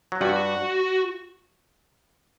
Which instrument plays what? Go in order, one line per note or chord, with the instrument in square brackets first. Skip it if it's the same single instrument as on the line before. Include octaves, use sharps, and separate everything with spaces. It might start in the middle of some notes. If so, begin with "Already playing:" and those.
[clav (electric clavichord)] F#3
[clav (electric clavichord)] G2 G3 [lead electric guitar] F#4